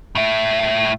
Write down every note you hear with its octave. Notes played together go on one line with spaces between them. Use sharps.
A2 E5